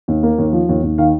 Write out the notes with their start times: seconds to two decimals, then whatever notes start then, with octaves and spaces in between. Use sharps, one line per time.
0.08 D#2
0.23 A#3
0.38 D#2
0.53 F3
0.69 D#2
0.83 D#2
0.98 D#3 F5